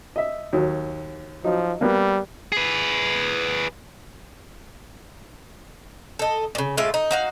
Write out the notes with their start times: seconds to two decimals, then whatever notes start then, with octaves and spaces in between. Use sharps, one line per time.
0.16 D#5 E5
0.53 D#2 F#3
1.44 F3 F#3 D#4
1.81 G3 A#3 B3
2.52 G#4 B4
6.19 A4 D#5
6.55 A#2 C#3
6.77 A2 G#3 F4 E5
6.94 D#4
7.11 D#4 F#4 F5